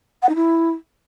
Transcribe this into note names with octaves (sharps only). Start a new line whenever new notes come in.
F#5
D#4
E4